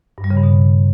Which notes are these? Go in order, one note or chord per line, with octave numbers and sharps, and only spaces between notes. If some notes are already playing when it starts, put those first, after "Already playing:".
G2
G3
C#3
G2
B2